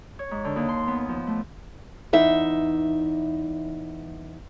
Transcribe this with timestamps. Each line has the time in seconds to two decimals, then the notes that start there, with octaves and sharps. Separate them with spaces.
0.19 C#5
0.31 G#2
0.45 D3
0.56 D#2
0.69 C6
0.87 B3
1.09 F3
1.27 A3
2.13 E2 D#4 E5